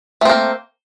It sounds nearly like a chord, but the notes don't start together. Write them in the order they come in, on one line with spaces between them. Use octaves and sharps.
A3 C4 A#3